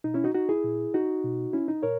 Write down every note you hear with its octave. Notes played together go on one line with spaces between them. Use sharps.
B2 D#4
C#4 E4
D#4 F#4
D#4 F#4
E4 G#4
A#2
D#4 F#4
B2
C#4 E4
D#4
A#2 A#4 C#5